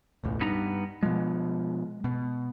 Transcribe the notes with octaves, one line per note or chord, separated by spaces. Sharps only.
E1 C#2 A2
G2 B3 D#4 A#5
B2 F3 G#3
B2